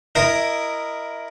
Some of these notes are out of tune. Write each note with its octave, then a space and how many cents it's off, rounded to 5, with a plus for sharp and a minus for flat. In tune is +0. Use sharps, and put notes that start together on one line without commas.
E4 +10 A#4 +0 D#5 -10